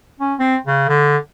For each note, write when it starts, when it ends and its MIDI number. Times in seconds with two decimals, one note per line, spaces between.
0.20 0.34 61
0.39 0.57 60
0.67 0.86 49
0.89 1.17 50